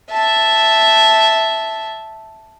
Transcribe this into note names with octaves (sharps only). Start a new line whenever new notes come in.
E5 A5